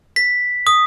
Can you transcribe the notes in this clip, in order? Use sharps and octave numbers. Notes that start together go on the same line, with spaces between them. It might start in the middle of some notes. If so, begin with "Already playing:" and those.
B6
D#6